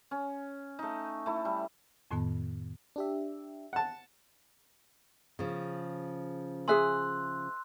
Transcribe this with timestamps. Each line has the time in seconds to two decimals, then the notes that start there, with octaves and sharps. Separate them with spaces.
0.11 C#4
0.79 A3 D#4
1.26 A3 E4
1.45 G3
2.11 F2 A2 D#3 B3 A5
2.96 D4 G4 E5
3.73 F#5 A5
5.39 C#3 F3
6.68 G#4 E5 G#5 C6 E6 F#6